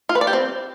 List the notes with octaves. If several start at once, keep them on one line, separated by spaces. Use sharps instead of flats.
F4
B4
D5
G4
C4